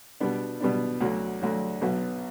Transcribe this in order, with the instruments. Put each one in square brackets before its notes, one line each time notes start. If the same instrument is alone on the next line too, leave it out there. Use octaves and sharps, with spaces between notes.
[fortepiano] B2 G3 B3 D4
B2 G3 B3 D4
D2 D3 F#3
D2 D3 F#3
B1 B2 F#3 B3 F#4